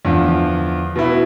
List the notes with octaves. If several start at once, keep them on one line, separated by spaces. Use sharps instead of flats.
E2 D3 F3
B2 B3 E4